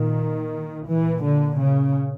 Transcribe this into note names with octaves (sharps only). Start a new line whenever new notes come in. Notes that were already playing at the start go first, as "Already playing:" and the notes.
Already playing: A#2 D#3
A#2 E3
D3
C#3